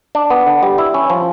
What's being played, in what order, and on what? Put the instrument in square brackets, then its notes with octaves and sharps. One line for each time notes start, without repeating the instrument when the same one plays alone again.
[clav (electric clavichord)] D4
B3
D3
G3
E4
C#4
F3